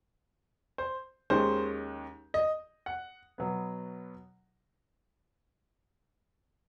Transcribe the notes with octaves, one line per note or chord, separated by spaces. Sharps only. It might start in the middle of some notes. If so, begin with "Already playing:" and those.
C5
D#2 D#3 G#3 C#4 C5
D#5
F#5
B2 F#3 B3